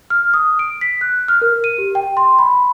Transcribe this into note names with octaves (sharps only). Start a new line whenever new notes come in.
F6
D#6
D7
B6
F#6
F6
A#4
D#7
G4
G5
C6
B5